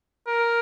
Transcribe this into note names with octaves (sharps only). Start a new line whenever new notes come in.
A#4